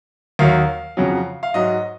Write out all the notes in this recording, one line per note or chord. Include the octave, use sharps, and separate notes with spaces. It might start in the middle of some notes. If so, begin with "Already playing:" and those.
D#2 D#3 F#3 F5
F2 C#3 F#3
F5
G#2 F#3 D#5